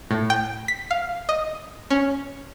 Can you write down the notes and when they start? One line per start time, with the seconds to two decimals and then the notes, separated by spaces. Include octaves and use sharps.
0.11 A2
0.30 G5
0.68 B6
0.91 F5
1.29 D#5
1.90 C#4